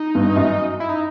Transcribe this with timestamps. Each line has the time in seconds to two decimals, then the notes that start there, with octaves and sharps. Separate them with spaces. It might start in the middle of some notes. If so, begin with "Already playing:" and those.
Already playing: D#4
0.15 G2
0.36 F#2
0.80 E4
0.89 D#4